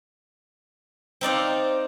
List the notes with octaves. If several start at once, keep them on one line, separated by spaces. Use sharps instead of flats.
C4 D#4 D5 F5